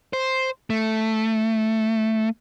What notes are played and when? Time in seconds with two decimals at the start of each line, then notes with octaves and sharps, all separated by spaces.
0.13 C5
0.70 A3